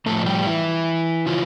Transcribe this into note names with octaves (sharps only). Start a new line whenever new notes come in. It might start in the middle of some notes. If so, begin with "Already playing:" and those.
A2 F3 A3 A4
G3 G4
E3 E4
C#3 E3 F4